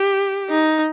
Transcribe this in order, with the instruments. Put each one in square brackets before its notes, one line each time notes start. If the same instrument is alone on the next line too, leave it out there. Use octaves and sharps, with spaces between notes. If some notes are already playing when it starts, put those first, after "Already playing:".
Already playing: [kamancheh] G4
D#4